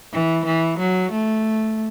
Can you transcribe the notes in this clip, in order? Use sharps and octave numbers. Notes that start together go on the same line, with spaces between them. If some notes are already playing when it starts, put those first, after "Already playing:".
E3
E3
F#3
A3